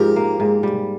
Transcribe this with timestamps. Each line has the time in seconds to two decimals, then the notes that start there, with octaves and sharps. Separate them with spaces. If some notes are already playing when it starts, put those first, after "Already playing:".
Already playing: G#2 F3 G4 A#4
0.16 A#3
0.40 G#2
0.63 G3